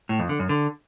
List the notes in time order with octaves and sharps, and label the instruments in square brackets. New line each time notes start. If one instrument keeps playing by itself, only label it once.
[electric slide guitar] A2
F2
D3
F#2
D3